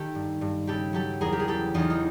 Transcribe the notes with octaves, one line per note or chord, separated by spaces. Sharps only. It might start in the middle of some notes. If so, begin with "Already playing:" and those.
Already playing: D#3 G4 A4
G2
G2
C#3 G4 A4
F#3 G4 A4
E2 G#4 A#4
G4
G#4
C#3 G4 A4
E2 D#4 F4
D#4